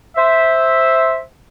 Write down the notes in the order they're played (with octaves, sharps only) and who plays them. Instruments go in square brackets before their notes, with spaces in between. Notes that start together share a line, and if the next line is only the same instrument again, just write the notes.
[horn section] C5 E5